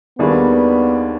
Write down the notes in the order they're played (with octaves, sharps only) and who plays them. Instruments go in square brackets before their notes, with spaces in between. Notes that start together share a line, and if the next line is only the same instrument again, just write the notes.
[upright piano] D#2 D#3 G3 D4 G#4 [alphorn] B3